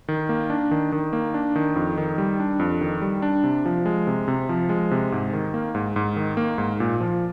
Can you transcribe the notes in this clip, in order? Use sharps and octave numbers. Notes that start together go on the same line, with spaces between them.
D#3
A#3
D4
D#3
D#3
A#3
D4
D#3
F2
D#3
G3
D4
F2
D#3
G3
D4
C3
F3
G#3
C3
C3
F3
G#3
C3
G#2
D#3
A#3
G#2
G#2
D#3
A#3
G#2
A#2
F3